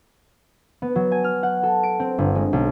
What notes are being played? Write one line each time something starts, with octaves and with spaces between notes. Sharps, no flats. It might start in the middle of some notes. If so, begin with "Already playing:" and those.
B3
F#3
G#5
F6
F#5
A4
D7
C4
G1
G#3
B1